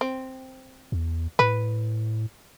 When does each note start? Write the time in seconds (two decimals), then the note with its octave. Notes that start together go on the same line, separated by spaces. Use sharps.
0.01 C4
0.92 E2
1.39 A2 B4